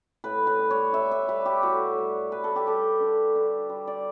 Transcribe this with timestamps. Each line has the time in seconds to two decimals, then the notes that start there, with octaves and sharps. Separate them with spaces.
0.24 A2 B4
0.47 B4
0.59 G3
0.71 C#5
0.93 G3 E5
1.11 E5
1.28 G3 B4
1.46 G4
1.62 A2 F#4
1.98 G3
2.32 G3 B4
2.44 A4
2.56 G4
2.67 G3 A4
3.00 D3
3.36 D3
3.69 G3
3.87 D5